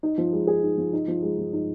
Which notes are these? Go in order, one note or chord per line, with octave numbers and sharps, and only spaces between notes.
D#4
F3
G#3
G#4
D#4
F3
D#4
F3
G#3
F3
D#4